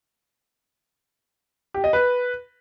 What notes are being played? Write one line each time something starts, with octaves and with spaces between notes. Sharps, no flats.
G4
D#5
B4